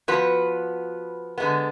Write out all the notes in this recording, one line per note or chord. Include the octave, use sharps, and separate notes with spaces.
F3 B3 F#4 B4
D3 G#3 B3